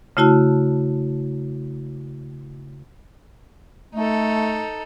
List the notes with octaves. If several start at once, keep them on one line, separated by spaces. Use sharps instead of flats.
C#3 A3 E4 F#4 A5 F6
A3 D#4 A4